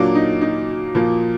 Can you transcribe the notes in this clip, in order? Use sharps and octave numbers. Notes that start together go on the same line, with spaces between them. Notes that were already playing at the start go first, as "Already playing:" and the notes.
Already playing: A#2 F#3 A#3 D4
D#4
D#4
A#2 F3 A#3